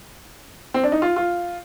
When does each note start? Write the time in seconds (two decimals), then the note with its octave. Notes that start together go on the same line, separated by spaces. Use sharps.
0.74 C4
0.83 D4
0.92 D#4
1.02 F4
1.16 F4